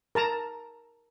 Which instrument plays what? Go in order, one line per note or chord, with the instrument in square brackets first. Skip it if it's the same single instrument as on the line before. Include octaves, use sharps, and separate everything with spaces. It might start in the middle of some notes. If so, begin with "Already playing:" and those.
[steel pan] A#4 A5 A#5